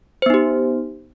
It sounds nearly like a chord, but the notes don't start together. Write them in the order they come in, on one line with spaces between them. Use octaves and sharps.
C5 B3 D#4 G4